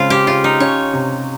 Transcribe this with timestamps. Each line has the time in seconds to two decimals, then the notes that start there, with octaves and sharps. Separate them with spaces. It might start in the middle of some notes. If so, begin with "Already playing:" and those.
Already playing: C#3 G#3 C4 F4
0.10 G4
0.27 C#3 F4
0.44 D#4
0.60 C#4 C#5
0.93 C3